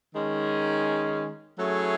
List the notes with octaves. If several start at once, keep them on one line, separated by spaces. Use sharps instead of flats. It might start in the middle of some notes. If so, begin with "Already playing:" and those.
D#3 G#3 C#4
F#3 A3 C#4 E4 G#4